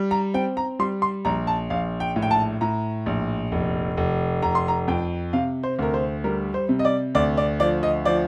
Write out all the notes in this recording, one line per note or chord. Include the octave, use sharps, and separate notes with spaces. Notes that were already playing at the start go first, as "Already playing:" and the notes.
Already playing: G3
A#5
C4 G5
A#5
G3 C6
C6
A#1 A#5
A5
A#1 F5
G5
A2
G5
A5
A2 A#5
A#1
F1
F1
F1 A#5
C6
A#5
F2 G5
C3 F5
C5
D2 A#4
C5
G3 A#4
C5
C3
D#5
D5
D2 D5
D5
F3 D5
D#5
F3 D5